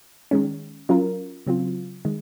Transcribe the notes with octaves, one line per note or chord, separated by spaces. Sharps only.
D#3 G#3 C#4
F#3 C#4 F4 A#4
C#3 F#3 C4 F4
D#3 G#3